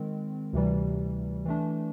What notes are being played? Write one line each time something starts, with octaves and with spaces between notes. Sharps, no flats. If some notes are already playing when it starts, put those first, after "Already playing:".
Already playing: D#3 G#3 C4
D2 C3 E3 G3
E3 A3 D4